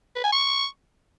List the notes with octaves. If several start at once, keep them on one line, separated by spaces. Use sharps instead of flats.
B4
G#5
C#6